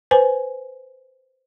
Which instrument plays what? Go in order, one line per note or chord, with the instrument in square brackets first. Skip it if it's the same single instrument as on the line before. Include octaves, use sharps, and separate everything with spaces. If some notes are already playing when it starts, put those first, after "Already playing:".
[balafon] B4 C5 G#5